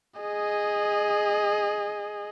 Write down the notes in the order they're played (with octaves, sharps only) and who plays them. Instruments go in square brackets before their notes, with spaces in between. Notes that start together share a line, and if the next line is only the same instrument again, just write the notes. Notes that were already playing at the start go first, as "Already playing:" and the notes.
[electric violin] G#4 D#5